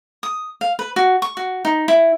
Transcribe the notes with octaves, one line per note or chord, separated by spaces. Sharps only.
D#6
F5
B4
F#4
C#6
F#4
D#4
E4